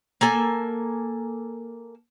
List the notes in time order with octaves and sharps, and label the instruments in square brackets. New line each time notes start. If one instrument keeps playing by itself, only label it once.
[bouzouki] A#3 A4 G#5